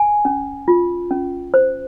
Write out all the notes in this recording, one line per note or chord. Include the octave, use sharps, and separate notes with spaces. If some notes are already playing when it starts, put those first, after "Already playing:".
Already playing: G#5
C#4
F4
C#4
C5